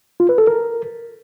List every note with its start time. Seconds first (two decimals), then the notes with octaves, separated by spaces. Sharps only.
0.20 F4
0.29 B4
0.38 A4
0.47 A#4